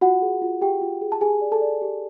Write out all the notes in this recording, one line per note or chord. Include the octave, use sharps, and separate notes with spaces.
F4 F#4 F#5
G#4
F4
G4 G#4 G5
F4
G#4
A5
G4 G#4 G#5
D5
A4 A5
D5
G4